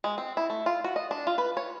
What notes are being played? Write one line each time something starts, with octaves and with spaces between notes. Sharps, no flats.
G#3
C4
E4
A3
F4
F#4
D#5
D4
F4
B4
C#5